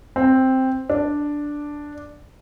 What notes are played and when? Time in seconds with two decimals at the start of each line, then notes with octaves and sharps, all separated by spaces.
0.16 C4
0.90 D4